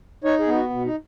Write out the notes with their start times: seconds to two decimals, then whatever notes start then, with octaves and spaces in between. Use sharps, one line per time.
0.24 D#4 C#5
0.39 G#4
0.47 B3
0.54 F#4
0.70 B2
0.85 D#4